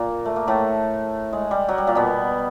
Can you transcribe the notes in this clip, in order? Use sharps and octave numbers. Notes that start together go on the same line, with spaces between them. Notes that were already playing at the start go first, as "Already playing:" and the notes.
Already playing: A#2 A#3
A3
A#3
A2 A3
G#3
G3
F#3
G3
A#2 A#3
B2 B3